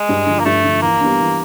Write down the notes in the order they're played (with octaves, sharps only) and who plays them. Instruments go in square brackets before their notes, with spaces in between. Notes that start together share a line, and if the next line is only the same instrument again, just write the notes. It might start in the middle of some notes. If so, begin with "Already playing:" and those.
Already playing: [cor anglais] G#3
[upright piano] G2
D3 F3
[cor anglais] A#3
[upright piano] G2 [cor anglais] A3
[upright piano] D3 F3
[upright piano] E3 [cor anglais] A#3
[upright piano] G3 B3 D4
E3